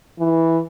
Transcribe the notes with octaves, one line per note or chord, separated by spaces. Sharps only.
E3